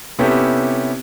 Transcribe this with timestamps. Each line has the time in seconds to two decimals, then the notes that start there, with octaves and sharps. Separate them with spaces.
0.19 C3 B3 C#4 E4 G4 A4